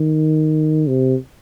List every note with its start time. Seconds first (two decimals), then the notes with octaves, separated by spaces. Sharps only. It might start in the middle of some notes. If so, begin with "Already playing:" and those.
Already playing: D#3
0.87 C3